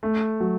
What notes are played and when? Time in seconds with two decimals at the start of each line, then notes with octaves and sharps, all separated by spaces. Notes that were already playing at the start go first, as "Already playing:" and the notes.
0.03 A3
0.40 F#3